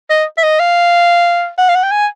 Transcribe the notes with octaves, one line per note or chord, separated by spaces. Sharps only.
D#5
E5
D#5
F5
F#5
F5
F#5
G5
G#5